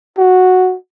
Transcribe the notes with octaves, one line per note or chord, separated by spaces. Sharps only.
F#4